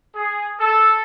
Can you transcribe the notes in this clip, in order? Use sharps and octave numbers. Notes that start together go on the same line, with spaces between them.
G#4
A4